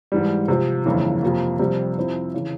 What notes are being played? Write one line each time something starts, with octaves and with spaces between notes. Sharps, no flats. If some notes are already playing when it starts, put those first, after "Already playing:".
G#2 E3 G3
C3 F3 C4
G1 F2 C#3 E3 A#3
F2 C3 F3 A#3
F2 C3 G3 C4
F2 C3 F3 C4 E4
C#3 E3